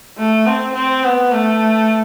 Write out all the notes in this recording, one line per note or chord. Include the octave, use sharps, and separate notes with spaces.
A3
C4
C4
B3
A3